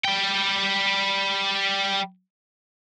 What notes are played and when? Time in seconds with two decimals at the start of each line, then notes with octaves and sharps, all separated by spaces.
0.05 G3 G5